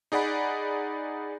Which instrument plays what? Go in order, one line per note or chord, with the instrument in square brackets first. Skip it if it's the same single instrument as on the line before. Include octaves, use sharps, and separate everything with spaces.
[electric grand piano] D#4 G#4 D5 F#5 B5